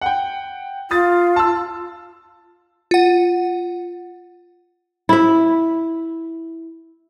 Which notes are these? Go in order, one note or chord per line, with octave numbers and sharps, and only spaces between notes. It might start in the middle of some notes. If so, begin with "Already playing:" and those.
F#5 G5
F4 D#6 A6
A5 E6
F4 F#5
E4 E5